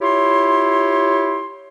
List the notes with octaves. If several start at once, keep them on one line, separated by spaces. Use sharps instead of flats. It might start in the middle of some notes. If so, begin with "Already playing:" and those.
E4 F4 G4 C#5 C6